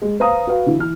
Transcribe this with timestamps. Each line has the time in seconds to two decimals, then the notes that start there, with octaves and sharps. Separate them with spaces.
0.02 G#3
0.20 B4 C5 F5 A#5 D#6
0.47 F#4 B4 F5
0.66 D3 E3 E4
0.79 E3 F6